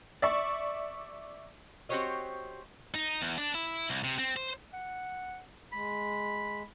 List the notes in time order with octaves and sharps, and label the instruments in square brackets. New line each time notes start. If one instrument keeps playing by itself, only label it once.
[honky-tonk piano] D5 E5 C#6
[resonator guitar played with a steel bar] C4 F#4 G4 C5 C#5 D#5
[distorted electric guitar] D#4
E2
D4
E4
C2
C3
C4
C5
[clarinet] F#5
[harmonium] G#3 [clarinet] B5